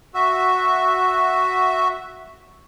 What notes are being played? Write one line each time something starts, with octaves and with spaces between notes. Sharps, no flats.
F#4 E5